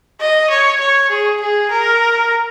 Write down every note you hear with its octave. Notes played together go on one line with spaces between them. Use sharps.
D#5
C#5
C#5
G#4
G#4
A#4